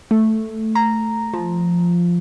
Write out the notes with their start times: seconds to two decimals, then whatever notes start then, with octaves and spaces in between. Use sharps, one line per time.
0.11 A3
0.75 A#5
1.33 F3